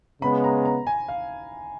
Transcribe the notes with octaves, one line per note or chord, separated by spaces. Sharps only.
C#3 G#3 B3 B5
A#5
A#5
G#5
F5